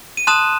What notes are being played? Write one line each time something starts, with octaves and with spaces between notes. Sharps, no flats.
D#7
A5 C6 D#6 F#6 E7